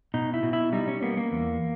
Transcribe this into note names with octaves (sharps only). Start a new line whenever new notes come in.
B2 D#4
E4
B2
E4
G3 D#4
C#4
A#3 B3
A#3
E2